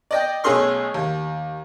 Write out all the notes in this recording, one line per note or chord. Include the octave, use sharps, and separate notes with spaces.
D5 D#5 G5
B1 A3 C#4 G#4 C6 F6
D#2